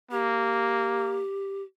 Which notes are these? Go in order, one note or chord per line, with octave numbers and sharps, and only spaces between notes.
A#3 G4